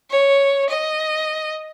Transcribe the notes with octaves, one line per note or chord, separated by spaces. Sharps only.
C#5
D#5